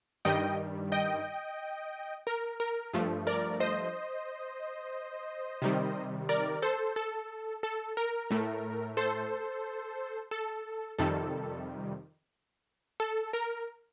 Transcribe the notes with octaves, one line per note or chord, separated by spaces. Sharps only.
G2 D#3 G3 D#5 G5
D#5 G5
A#4
A#4
G2 F3 A3
A#4 D5
C5 D#5
C3 D#3 G3
A#4 D5
A4 C5
A4
A4
A#4
A2 A3
A4 C5
A4
F2 C3 D#3 G3 A4
A4
A#4